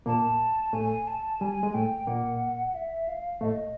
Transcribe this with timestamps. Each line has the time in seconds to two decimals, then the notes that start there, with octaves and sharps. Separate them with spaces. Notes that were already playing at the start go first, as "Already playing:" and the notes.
0.06 A#2 A#3 A5
0.73 A2 A3 G#5
1.07 A5
1.41 G3 G#5
1.63 G#3
1.74 A2 A3 G5
2.07 A#2 A#3 F#5
2.74 E5
3.08 F5
3.41 A2 A3 D#5